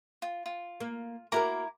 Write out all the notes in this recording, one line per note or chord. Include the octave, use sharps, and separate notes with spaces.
F4
F4
A#3
A#3 E4 F#4 A#4 A#5 D6